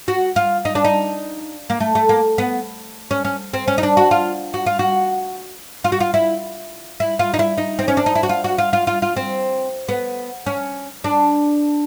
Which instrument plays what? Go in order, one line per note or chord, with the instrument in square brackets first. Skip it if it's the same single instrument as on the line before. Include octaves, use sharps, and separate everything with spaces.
[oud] F#4
F4
D#4
D4
D#4
A#3
A3
A3
A#3
B3
C#4
C#4
C4
C#4
D#4
D4
F#4
F4
F#4
F4
F#4
F4
F#4
F4
E4
E4
F4
D#4
E4
D#4
C4
C#4
D4
D#4
E4
F#4
F4
F#4
F4
F4
F4
F4
C4
B3
C#4
D4